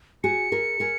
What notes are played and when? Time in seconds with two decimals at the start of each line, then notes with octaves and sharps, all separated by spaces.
0.24 F#4 G#4 C#7
0.52 G#4 A#4
0.80 G#4 A#4